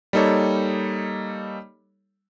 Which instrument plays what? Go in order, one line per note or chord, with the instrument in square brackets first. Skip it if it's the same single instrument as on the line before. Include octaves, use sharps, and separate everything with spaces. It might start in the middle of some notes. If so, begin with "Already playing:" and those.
[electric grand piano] G3 A#3 D#4 A4 C#5